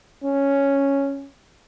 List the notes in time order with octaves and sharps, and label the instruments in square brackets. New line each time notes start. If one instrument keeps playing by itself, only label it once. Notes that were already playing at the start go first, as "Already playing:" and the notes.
[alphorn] C#4